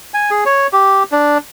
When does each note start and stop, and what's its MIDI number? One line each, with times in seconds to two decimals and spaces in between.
0.14 0.31 80
0.31 0.44 68
0.46 0.67 73
0.73 1.03 67
1.12 1.38 62